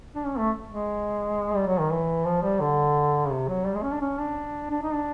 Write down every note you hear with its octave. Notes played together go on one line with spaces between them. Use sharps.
D4
C#4
A3
G#3
G3
F#3
D#3
E3
F3
G3
D3
C#3
C3
F#3
G3
G#3
C#4
D4
C#4
D4
D4
D#4
D4